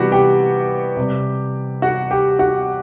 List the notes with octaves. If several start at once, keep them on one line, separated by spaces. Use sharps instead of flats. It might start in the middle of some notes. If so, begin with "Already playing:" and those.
Already playing: C3 E3 G3 B3 F#4 G4 F#5
G4 G5
C3 G3
F#4 F#5
G4 G5
F#4 F#5